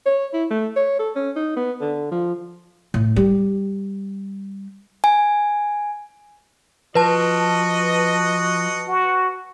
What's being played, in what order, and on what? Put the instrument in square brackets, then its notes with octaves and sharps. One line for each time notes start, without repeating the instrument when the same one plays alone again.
[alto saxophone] C#5
E4
A3
C#5
A4
C#4
D#4
B3
D3
F3
[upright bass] A2
G3
[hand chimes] G#5
[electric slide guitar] F3 [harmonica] F#4 D#5 [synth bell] B4 A5
[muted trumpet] F#4